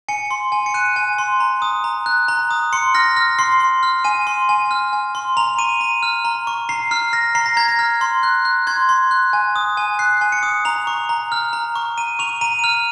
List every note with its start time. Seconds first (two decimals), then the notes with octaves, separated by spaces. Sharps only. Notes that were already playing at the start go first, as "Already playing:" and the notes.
0.09 G#5 C#7
0.31 C6
0.52 G#5
0.66 C#7
0.74 F#6 D#7
0.96 G#5
1.18 C6
1.40 A#5
1.62 D#6
1.84 A#5
2.06 F#6
2.28 A#5
2.51 D#6
2.73 C6 C#7
2.94 F6 A#6
3.16 F6 A#6
3.39 C6 C7
3.60 C6
3.83 F6
4.04 G#5 D#7
4.27 C6
4.49 G#5
4.71 F6
4.93 G#5
5.15 C6
5.37 A#5 F7
5.59 C#6 D#7
5.81 A#5 D#7
6.03 F6
6.25 A#5
6.47 C#6
6.69 A#5 C7
6.91 F6 C7
7.13 F6 A#6
7.35 A#5 C7
7.46 A#6
7.57 A#5 G#6
7.68 A#6
7.79 F6
8.01 C6
8.23 F#6
8.45 F#6
8.67 C6 G#6
8.89 C6
9.11 F#6
9.33 G#5
9.56 D#6
9.77 G#5
9.99 F#6 C7
10.21 G#5
10.32 C#7
10.43 D#6
10.65 A#5 F7
10.87 C#6
11.09 A#5
11.32 F6
11.53 A#5
11.75 C#6
11.97 A#5 D#7
12.19 C#6 F7
12.41 A#5 D#7
12.59 D#7
12.64 F6 F7